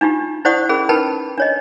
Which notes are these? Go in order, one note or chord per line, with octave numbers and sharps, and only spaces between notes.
D4 D#4 F4 G4
E4 C5 D5 F#5 C#6 D#6
C#4 G#4 A#4 B5
D#4 A#4 B4 G5 A5 B5
D4 C#5 D#5